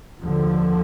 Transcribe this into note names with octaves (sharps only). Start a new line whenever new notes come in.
D#2 D3 F3